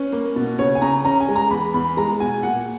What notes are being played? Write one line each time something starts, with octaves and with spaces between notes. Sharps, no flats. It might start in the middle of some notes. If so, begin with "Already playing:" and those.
Already playing: C#4 B4
A#3
B2
C#3 C#5
G#5
C#3 A#5
C#4 A#5
G#5
G#3
A#5
E2 B5
E2 B5
G#3 A#5
B2 G#5
A#2 F#5